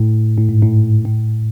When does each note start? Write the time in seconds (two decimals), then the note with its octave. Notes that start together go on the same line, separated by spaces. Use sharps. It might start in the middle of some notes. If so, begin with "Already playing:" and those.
Already playing: A2
0.38 A2
0.49 G#2
0.62 A2
1.05 A2